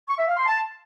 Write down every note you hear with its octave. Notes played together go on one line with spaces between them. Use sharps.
C#6
E5
F5
C6
A5